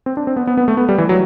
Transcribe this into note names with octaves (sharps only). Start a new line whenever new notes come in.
C4
D4
C4
B3
B3
B3
A3
B3
G3
E3
F#3